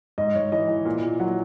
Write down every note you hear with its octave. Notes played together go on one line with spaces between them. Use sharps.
G#2 D#5
G#2 C#5
E3 D#5
E3
A#2
A#2
F#3 F#5